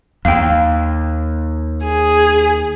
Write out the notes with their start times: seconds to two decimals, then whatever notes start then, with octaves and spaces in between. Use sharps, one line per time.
0.25 D#2 F5 G5
1.84 G#4